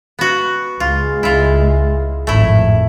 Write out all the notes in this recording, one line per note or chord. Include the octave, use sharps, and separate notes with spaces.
B3 F#4
C#2 G#3 F4
E4 F4
G#1 F2 A2 A3 E4